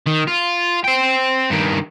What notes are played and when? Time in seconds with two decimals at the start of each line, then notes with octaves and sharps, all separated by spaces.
0.06 D#3
0.27 F4
0.84 C5 G5
1.51 G2 D#3